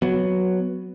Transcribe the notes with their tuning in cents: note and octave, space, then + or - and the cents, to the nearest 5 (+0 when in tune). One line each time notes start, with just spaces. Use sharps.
F#3 +0 B3 +0